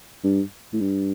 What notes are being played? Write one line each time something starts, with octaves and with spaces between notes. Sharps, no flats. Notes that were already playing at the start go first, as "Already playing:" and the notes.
G2
A2
G2